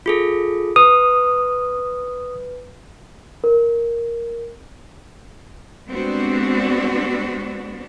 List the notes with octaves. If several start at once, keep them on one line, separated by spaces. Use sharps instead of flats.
F4 G#4 A4
B4 D#6
A#4
G3 G#3 B3 C4 D4 F#4